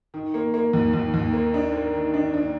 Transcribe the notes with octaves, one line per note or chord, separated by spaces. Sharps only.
D#3
A#3
A#3
D#2
D#2
D#2
A#3
D4
A#3
D#3
D4
D4